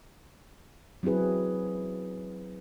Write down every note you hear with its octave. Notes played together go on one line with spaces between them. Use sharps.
F#3 C4 E4 G#4 B4